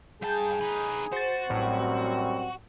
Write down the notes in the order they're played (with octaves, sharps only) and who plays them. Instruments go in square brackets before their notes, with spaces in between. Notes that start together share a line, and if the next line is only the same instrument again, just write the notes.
[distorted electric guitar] G2 A5 [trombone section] G#4 [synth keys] G6
[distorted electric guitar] D#4 B4
[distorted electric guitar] F#4 [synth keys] C5 A6
[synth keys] A1 A2 [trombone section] F#2 G3 C4